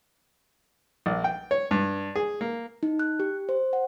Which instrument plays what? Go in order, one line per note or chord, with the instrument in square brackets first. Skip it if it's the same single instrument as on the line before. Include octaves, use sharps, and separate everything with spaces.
[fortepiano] A#1
G5
C#5
G2
G#4
A#3
[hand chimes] D#4
F#6
G4
C5
F#5